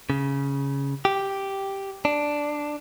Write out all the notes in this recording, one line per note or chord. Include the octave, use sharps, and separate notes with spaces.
C#3
G4
D4